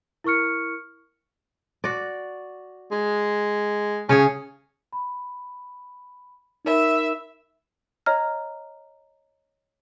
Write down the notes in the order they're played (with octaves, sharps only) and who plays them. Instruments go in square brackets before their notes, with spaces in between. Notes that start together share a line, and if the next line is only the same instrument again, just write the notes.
[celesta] E4 A#4 C#6 F6 C#7
[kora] F#4 D5
[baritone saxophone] G#3
[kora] C#3 G#4 [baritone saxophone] C#4
[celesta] B5
[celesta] D#4 A#4 B5 [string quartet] E5
[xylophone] C#5 D#5 A#5 F6